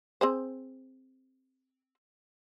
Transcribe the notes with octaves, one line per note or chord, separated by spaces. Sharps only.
C4 G#4 C5